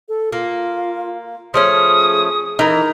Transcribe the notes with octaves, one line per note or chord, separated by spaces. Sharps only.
A4
A#3 F4
F3 A3 C#4 G#4 D#6
E3 D#4 A#4